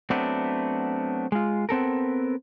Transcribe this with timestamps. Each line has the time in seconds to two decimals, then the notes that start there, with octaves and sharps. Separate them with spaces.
0.10 F#3 A3 B3 C4 D4
1.32 G#3 F4
1.69 B3 C4 A4 A#4